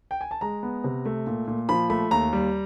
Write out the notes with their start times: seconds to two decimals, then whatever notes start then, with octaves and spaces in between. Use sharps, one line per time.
0.11 G5
0.21 G#5
0.31 A5
0.41 G#3 A#5
0.63 B3
0.84 C3
1.06 A3
1.27 A#2
1.48 A#2
1.69 F3 B5
1.90 A3 B5
2.11 D#2 A#5
2.33 G3